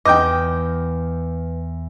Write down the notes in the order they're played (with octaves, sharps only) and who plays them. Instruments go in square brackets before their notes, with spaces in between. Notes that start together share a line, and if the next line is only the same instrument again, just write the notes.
[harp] E2 [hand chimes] B4 [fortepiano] D#5 G5 [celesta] D6 G6